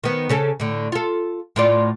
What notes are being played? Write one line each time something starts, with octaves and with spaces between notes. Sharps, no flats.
D#3 B3
C#3 C#4 A4
A2 D3
F4 A4
A2 F4 D5